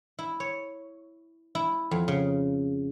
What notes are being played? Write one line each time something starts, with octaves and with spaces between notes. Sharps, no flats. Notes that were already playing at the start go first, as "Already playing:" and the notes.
E4
C#5
E4
F2
C#3